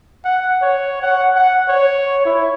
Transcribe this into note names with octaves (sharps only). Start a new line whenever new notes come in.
F#5
C#5
F#5
F#5
C#5
E4